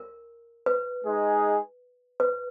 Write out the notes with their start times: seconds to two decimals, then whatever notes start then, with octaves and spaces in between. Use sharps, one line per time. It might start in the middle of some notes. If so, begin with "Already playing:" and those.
Already playing: A#4
0.66 B4
1.05 G#3 D#4 G#4
2.20 B4